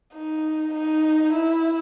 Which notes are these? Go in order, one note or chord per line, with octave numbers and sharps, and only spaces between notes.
D#4
D#4
E4